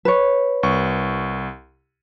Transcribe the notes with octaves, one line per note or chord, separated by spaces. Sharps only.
B4 C#5
C2 C#6